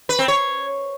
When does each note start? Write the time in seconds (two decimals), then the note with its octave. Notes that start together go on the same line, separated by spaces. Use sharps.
0.09 B4
0.19 C4
0.28 C#5